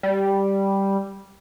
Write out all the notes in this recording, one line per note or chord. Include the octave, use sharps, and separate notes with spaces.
G3